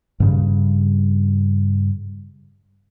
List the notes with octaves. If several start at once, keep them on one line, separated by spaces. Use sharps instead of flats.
G2 C#3 G3